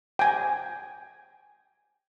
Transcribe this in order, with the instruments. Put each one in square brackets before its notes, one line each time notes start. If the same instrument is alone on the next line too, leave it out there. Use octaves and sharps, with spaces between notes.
[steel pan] G5 G#5